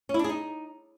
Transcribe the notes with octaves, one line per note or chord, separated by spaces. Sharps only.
C#4
E4
D4
G#4
D#4